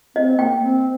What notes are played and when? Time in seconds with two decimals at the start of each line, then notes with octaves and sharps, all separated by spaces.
0.16 C4 D#5
0.39 A#3 G5
0.62 C4